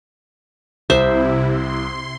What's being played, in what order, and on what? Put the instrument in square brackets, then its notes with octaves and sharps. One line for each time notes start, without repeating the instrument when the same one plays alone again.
[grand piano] C2 [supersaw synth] C3 E4 [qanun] C5 E5
[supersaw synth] C6